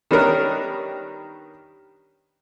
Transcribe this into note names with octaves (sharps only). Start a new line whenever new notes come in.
D#3 G3 B3 C#4 D4 A#4